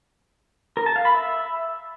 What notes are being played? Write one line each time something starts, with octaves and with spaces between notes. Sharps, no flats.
A#4
A5
F5
B5
E5